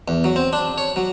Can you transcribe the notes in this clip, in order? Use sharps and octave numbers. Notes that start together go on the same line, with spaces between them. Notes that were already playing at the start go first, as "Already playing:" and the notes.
E2
F#3
C4
D4
C#5
F#3